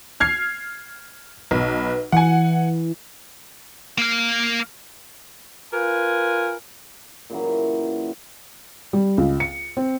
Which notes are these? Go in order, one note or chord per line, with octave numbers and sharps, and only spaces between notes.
F6 G#6 C7
B1 B4
E3 F#5 G#5
A#3 F5
F4 A#4 B4 G#5
A#2 C#3 E3 F#3
G3
C#2
C#7
C4